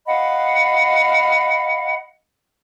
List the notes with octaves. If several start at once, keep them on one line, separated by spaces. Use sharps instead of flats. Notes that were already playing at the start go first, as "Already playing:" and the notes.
D#5 F5 F#5 B5